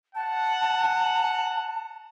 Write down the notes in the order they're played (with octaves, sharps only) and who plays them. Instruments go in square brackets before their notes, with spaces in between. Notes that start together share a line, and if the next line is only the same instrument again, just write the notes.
[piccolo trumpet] F#5 [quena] A5